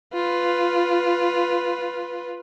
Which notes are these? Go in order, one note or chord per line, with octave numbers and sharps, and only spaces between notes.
F4 B4